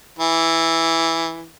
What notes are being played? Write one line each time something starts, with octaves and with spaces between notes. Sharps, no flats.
E3